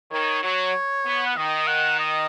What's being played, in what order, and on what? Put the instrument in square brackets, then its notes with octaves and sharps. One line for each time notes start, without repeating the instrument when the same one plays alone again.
[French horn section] D#3 [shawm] C#5
[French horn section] F#3 [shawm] C#5
[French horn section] B3
[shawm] F#5
[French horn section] D#3 [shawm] D#5
[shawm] F#5
D#5